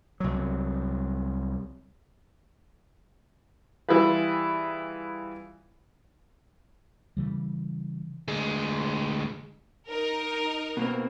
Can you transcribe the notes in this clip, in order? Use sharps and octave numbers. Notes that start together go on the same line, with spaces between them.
C2 F#3
E3 G3 E4 F4 G#4 B4
C#3 E3 G3
D2 G#3
D#4 A#4
B2 A#3 C4